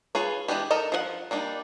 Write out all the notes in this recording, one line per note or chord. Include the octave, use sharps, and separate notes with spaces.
F4 G#4 B4 C#5
E3 G#3 B3 D4 G4
D#4 A4 A#4 D#5
F3 G#4 F#5
G3 A#3 D4 D#4